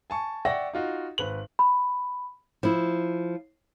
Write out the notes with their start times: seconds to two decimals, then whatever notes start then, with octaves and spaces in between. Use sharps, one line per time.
0.10 G#5 A5 C#6
0.45 D5 E5 F#5 G5 C#6 A#6
0.73 D#4 F4 F#4
1.18 G#1 B4 F#7
1.59 B5
2.63 F3 E4